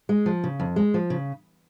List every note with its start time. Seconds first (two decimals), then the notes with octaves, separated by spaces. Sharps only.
0.09 G#3
0.26 F3
0.44 C#3
0.60 F2
0.76 G#3
0.94 F3
1.10 C#3